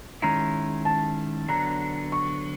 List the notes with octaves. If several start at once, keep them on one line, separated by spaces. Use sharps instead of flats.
D#3 G#3 C#4 E4 A#5
A5
D3 F#3 B3 D4 A#5
C#6